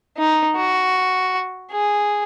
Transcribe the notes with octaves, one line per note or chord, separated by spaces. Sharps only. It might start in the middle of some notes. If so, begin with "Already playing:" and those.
D#4
F#4
G#4